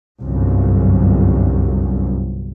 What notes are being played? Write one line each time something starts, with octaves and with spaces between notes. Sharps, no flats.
G1 C2 F#2